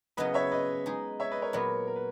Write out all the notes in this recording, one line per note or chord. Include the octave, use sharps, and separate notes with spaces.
C#3 F#3 B3 E4 B4 D#5
C#5 E5
B4 D#5
G#3 D#4 G#4
C#5 E5
B4 D#5
A#4 C#5
A#2 F#3 B3 A#4 C#5
A#4
B4